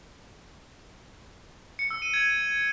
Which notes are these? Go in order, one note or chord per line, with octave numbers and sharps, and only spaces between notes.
C#7
E6
D#7
G#6